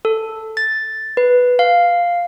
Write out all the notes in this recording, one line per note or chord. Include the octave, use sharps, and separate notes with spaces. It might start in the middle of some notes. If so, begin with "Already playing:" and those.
A4
A6
B4
F5